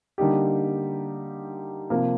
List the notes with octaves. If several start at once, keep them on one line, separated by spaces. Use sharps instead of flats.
D3 G3 A#3 D#4 G4
C3 F3 A#3